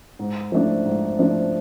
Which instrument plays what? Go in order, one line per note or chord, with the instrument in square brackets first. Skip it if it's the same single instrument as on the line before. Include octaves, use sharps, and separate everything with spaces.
[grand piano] G#2
F3 A3 D4
G#2
F3 A3 D4